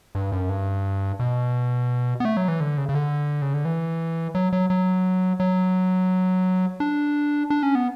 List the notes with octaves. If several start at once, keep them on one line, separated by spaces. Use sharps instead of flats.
G2
F#2
G2
B2
B3
A3
F#3
E3
D3
C#3
C#3
D3
C#3
D3
E3
F#3
F#3
F#3
F#3
D4
D4
C#4
B3